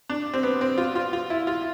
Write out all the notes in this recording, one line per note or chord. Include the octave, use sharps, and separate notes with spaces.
D4
C4
B3
C4
F4
F4
F4
E4
F4